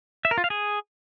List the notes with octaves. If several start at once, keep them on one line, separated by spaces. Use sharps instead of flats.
E5
A#4
F4
F5
G#4